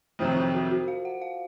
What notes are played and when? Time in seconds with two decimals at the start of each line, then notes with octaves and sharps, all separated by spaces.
0.19 F2 C3 D#3 F#3 C4 C5
0.36 F4
0.54 F#4
0.71 F#4
0.88 F5
1.05 F#5
1.22 F5